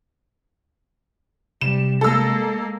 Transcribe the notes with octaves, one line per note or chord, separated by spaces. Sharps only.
C3 G3 E7
G#3 A#3 A4 E6